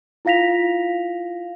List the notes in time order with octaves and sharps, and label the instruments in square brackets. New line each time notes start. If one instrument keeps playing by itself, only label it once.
[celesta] E4 F4 F5 A#6 B6 F7